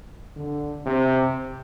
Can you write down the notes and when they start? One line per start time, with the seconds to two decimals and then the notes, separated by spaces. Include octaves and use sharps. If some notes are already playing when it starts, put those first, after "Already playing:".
0.36 D3
0.86 C3